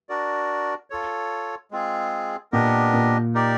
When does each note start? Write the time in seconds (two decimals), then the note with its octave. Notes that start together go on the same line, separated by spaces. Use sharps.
0.09 D4 F#4 A#4 D5
0.90 F4 A4 C#5
1.71 G#3 C4 F4 G#4
2.52 A#2 B3 D4 G4 A#4 D#5
2.93 A#2
3.34 D#4 G4 A#4 D5